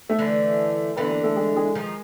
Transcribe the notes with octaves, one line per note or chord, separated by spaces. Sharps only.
A3 A4
D3 E3
D3 E3 B3 B4
A#3 A#4
A3 A4
G#3 G#4
G#3 G#4
D#3 F3